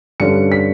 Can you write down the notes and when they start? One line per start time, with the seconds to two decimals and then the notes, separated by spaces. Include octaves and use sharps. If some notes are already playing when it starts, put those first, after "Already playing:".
0.20 G2 D3 G3 C#4 C#7
0.52 B6